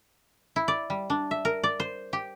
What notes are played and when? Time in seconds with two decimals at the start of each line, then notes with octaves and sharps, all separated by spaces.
0.56 E4
0.68 D5
0.90 G3
1.10 D4
1.31 E5
1.45 A#4
1.64 D5
1.80 C5
2.13 G4